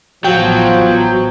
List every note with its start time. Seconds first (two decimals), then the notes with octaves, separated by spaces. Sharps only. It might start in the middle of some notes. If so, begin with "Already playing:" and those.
0.24 A1 A2 F3 F#3 B3 G5